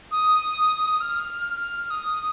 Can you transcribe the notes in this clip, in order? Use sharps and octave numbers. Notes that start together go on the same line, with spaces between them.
D#6
F6
F6
D#6